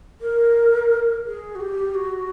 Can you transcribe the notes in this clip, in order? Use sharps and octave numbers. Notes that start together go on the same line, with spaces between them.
A#4
G#4
F#4
G4
F#4